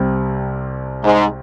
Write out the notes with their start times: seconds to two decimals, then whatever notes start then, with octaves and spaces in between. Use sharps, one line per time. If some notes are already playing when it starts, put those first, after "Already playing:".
Already playing: C2 C3 G3 C4 G4
1.04 G#2